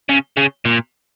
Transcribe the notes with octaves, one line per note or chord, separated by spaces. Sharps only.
C#3
C#3
A#2